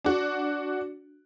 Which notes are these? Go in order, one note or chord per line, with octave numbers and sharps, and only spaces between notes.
D4 F#4